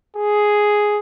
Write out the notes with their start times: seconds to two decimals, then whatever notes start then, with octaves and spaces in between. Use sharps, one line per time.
0.16 G#4